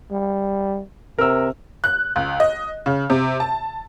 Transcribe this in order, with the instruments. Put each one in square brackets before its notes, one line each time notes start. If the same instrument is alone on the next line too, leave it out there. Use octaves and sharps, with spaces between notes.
[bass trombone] G3
[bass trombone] C3 [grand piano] A#4 E6
[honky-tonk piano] F#6
C#2
D#5
C#3
C3
A5